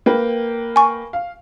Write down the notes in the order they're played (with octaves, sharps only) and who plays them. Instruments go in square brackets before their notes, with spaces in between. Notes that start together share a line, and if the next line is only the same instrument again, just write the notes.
[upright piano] A#3 B4 G5
[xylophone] G#5 C#6
[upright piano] F5